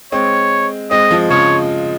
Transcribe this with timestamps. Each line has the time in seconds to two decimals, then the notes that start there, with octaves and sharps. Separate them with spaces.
0.12 G#3 C4 C#5
0.91 G#3 C4 D#5
1.11 F3 G#3
1.30 C#3 F3 C#5